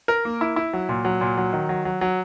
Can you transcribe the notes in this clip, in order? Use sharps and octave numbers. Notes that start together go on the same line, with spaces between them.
A#4
A#3
E4
E4
F#3
A#2
F#3
A#2
F#3
D#3
F#3
F#3
F#3